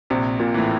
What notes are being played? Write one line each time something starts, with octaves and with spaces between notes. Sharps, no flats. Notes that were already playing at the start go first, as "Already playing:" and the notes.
A#1 C3
A#2
A2 E3